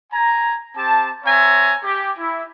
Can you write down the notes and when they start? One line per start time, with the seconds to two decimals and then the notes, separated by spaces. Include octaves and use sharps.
0.12 G#5 A#5
0.76 C4 G4 A5
1.25 C4 C#5 E5 G#5 A#5
1.83 G4
2.18 E4